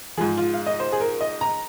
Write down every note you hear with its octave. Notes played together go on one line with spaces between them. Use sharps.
G#2 F3 G#4
F4
F5
D#5
C5
G#4
A#4
D#5
A#5